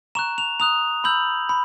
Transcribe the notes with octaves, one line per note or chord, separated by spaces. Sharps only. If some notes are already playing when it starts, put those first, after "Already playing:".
A#5 C#6 F#6 E7
F7
A#5 D#6 F#6 F7
B5 E6 G6 F#7
B5